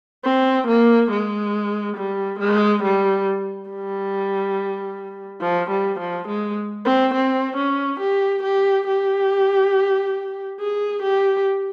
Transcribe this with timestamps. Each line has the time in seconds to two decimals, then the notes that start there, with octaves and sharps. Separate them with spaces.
0.25 C4
0.68 A#3
1.11 G#3
1.97 G3
2.40 G#3
2.83 G3
3.70 G3
5.42 F3
5.70 G3
6.00 F3
6.28 G#3
6.85 C4
7.14 C4
7.57 C#4
8.00 G4
8.43 G4
8.87 G4
10.60 G#4
11.03 G4